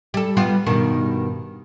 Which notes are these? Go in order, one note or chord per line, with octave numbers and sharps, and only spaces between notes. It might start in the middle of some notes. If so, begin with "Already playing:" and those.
G3 A4
G3 B3 F4
G2 B2 D#3